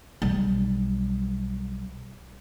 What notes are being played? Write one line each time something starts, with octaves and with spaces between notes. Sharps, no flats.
B1 G3